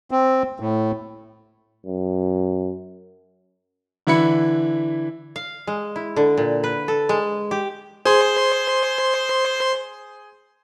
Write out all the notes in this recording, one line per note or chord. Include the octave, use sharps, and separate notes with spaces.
C4
A2
F#2
D3 E3 E4 B5 C#7
F5
G#3
E4
D3
A#2
B4
A4
G#3
G4
G#4 C5 C6